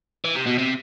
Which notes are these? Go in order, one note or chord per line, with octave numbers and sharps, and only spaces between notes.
E3
C3
B2
C3